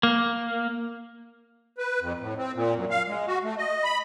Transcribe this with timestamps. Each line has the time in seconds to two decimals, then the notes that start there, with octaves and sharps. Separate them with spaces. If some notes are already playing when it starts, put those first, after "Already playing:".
0.03 A#3
1.78 B4
2.01 F2
2.20 A2
2.38 C4
2.55 A#2
2.75 F#2
2.90 F5
3.08 G#3
3.27 F#4
3.44 A3
3.58 D#5
3.84 B5